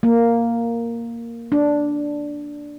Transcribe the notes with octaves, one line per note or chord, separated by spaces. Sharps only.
A#3
D4